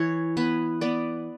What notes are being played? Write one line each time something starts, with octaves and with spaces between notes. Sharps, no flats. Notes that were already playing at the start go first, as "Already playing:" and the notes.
Already playing: E3 C#5
B3 B4
B3 D5